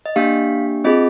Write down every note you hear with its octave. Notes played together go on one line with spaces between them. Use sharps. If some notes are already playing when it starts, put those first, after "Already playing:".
D#5
A#3 D4 G4 F5
C4 F4 G#4 D#5